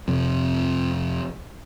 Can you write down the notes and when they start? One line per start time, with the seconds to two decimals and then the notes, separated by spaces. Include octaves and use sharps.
0.08 F2 C3